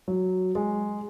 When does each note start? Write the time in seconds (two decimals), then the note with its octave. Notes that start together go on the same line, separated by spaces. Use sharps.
0.08 F#3
0.55 G#3